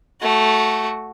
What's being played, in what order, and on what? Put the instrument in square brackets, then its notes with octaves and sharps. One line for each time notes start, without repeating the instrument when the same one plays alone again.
[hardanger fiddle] A3 F#4